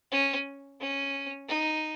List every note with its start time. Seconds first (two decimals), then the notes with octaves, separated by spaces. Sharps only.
0.12 C#4
0.81 C#4
1.48 D#4